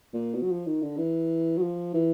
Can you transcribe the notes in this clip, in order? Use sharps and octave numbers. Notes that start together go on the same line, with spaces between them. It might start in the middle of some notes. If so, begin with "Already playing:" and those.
A#2
B2
F#3
F3
D#3
D3
E3
F#3
F3
E3